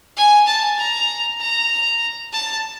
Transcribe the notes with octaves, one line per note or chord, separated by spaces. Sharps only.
G#5
A5
A#5
A#5
A5